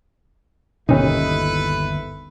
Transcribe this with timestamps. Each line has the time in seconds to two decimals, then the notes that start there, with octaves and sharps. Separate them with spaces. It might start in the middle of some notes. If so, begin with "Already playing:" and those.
0.89 G1 D#2 B2 C#4 D#4 E4 A4 B4